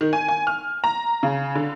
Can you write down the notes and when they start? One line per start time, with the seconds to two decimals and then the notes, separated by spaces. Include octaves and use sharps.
0.01 D#3
0.13 G#5
0.28 G#5
0.47 F6
0.84 A#5
1.23 C#3
1.55 D3